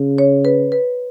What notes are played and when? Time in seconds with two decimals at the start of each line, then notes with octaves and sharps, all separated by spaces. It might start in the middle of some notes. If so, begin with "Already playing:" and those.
Already playing: C#3
0.18 C#5
0.45 B4
0.72 B4